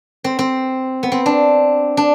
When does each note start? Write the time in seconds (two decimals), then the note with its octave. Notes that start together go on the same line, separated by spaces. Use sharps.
0.24 C4
0.39 C4
1.03 B3
1.12 C4
1.26 D4
1.97 D4